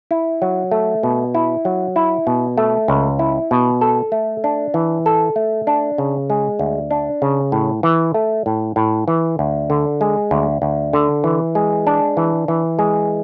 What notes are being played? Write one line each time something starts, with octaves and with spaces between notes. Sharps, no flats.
E4
F#3
A3
B2
E4
F#3
E4
B2
A3
C#2
E4
B2
A4
A3
D4
E3
A4
A3
D4
C#3
G#3
D2
D4
C#3
A2
E3
A3
A2
A2
E3
D2
D3
G#3
D2
D2
D3
E3
G#3
D4
E3
E3
G#3